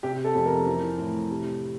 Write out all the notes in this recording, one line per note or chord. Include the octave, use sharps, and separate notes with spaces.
C3 G4
A4
F2
A#4
E3
A2
C3